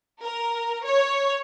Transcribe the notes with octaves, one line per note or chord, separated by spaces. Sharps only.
A#4
C#5